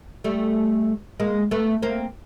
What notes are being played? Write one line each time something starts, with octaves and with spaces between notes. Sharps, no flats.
G3 A3
G#3 A#3
A3 B3
A#3 C4